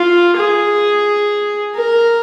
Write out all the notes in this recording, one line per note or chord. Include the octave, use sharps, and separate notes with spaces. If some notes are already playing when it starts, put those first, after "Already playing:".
Already playing: F4
G#4
A#4